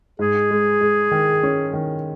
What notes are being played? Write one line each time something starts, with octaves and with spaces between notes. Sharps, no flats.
G#2 G#4
G#3
G#3
D#3
C#4
D#3